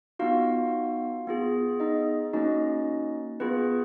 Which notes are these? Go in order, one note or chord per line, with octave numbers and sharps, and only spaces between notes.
B3 D#4 F4 F#4 F5
B3 F4 G#4
D#4 D#5
A#3 C#4 D#4 F#4 D#5
B3 F4 G#4 B4